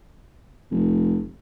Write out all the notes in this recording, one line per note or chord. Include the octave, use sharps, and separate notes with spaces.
F1